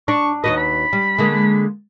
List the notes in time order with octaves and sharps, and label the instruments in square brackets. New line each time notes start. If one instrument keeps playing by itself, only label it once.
[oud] D4 [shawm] C#6
[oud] D#2 F#4 B4 [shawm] D#5
[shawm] B5
[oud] G3
D3 G#3 A#3